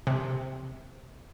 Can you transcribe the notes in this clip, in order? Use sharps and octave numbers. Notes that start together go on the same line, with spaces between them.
C3